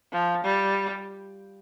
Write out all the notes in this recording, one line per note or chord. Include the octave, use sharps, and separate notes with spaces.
F3
G3